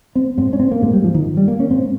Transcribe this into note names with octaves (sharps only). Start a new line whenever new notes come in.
C4
G#2 C4
C#4
C4
A#3
G#2 G#3
G3
F3
D#3
G#2
G3
A#3
C#4
G#2 C4